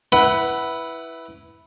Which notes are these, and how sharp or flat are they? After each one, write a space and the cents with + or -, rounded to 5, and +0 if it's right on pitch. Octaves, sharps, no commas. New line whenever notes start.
E4 +0 B4 -5 F#5 +25